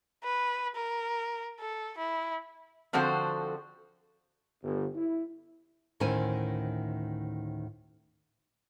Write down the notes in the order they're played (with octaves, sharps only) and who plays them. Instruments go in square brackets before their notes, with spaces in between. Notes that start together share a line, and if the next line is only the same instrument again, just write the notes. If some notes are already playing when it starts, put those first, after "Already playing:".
[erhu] B4
A#4
A4
E4
[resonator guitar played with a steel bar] D3 F3 C4 F#4 A4 C5
[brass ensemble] G1
E4
[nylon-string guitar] D2 A2 D#3 C#4 C5 G#5